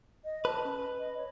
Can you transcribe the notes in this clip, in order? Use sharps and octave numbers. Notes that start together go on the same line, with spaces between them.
D#5
B4 A5
C#4
D#5
C#5